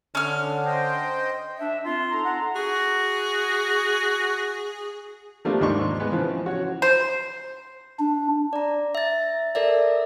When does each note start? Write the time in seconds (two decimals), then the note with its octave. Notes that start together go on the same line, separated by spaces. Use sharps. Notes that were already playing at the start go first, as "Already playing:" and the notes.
0.15 D3 C#4 F6
0.66 C5 D#5 G5
1.58 D4 E5
1.85 C4 F4 C6
2.11 D#4 A4 A#5
2.24 F#5
2.56 F#4 G#4
5.45 F3 G3 A3 A#3 D4 F4
5.61 D#2 G#2 D4 D#4 C6 C#6
6.00 G#3 B3 B4
6.12 C#3 E3 F3
6.46 F#4 C#5
6.82 C5
7.99 D4
8.53 D5 A#5
8.95 E5 A6
9.55 A4 A#4 D5 E5